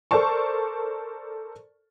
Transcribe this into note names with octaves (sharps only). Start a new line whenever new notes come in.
A4 A#4 C5 D5 A5 C#6